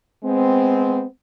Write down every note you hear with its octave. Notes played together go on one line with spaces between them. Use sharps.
G#3 B3 C4